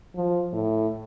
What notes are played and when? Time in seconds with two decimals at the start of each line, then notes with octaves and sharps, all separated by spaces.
0.15 F3
0.53 A2